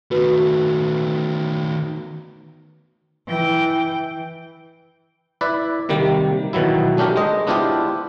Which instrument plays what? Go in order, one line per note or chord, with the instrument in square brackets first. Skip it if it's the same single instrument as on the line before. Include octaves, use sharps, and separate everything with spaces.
[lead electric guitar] D#3 A3 [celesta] F#4 B4
[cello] E3 G5
[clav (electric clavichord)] E4 B4 D5
C3 D#3 G3 A#3
B2 D#3 E3 F#3 E4
A3 C#4 D4 G4 A#4
G#3 C5 D#5
B3 D4 E4 F4 G4 C5